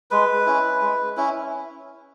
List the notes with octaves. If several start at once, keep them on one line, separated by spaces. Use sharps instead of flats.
G#3 B4
C#4 E4
G#3
C#4 E4